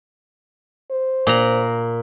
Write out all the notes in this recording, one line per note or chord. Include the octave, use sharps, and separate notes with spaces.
C5
A#2 A#5